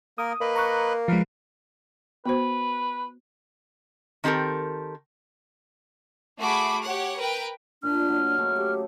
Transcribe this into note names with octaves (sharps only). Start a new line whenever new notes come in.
A#3 A#4 D#6
A#3 B4 D#5 B5
A#5 C#6 F#6
F3 G#3 A#4 B4 F5
B3 F#4 B4 C5
D#3 C4 G4 A4 A#4
A3 F#4 G#4 B5 D6
G4 C#5 F#5
A#4 B4 G5
A#2 D4 D#5 E5 F6
F#3
C#3 A3 A#3
G4 A4